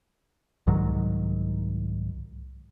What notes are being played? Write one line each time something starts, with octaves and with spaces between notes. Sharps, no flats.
C2 G#2 D#3 F#3